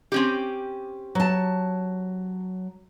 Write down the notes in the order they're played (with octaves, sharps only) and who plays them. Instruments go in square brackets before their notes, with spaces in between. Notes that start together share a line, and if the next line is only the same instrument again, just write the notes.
[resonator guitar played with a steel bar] C4 C#4 G4
[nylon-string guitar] F#3 A5